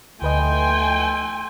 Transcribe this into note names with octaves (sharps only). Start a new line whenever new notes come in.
D2 A3 B4 D#5 G5 G#5 C6